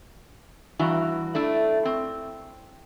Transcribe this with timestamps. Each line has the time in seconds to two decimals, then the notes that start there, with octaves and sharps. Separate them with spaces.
0.79 G2 E3 F#4 A#5
1.35 A3 D4 E4
1.85 C4